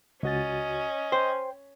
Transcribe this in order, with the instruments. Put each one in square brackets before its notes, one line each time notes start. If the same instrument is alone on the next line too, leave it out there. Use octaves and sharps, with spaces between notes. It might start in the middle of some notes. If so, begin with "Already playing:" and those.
[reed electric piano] C#2 F#4 A6 [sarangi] C#4 [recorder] D#5
[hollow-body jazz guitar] C5 [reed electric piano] G5